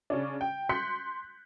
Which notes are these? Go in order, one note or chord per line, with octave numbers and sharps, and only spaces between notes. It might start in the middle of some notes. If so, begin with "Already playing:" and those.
C#3 C#4 D4
G5
C6 F#6 G6 B6 C#7